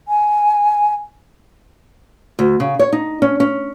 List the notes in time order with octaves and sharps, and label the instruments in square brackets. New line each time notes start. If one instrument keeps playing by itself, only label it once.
[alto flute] G#5
[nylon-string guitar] D2
C#3
C#5
D#4
C#4
C#4